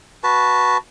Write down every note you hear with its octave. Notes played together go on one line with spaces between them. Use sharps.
F#4 B4 A5